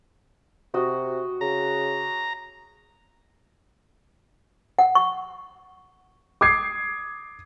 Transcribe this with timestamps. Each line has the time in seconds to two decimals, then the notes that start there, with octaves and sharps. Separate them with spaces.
0.74 C3 F#4 D#5
1.41 C#3 A#5
4.79 F#5
4.95 C#6
6.41 D6 D#6 G#6 C7